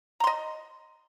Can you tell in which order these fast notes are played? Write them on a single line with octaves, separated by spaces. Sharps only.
A#5 C6 D#5